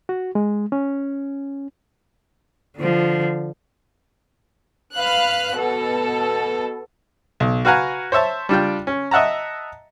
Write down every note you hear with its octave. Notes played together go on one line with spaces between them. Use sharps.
F#4
G#3
C#4
D3 F3
B4 F5 F#6
B2 A4
B1
F#4 B4 F5 F#5 G#5 A#5
C5 C#5 E5 A5
G3 D4 F4 G5
C#4
D#5 E5 F#5 A5 A#5